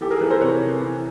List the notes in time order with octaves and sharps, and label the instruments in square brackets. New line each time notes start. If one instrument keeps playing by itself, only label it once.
[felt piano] E3 G4 A4
G#4 A#4
E3 A4 B4
A#4 C5
C3 B4 C#5
E3
E3